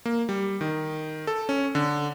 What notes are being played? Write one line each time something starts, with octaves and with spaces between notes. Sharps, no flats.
A#3
G3
D#3
A4
C#4
D3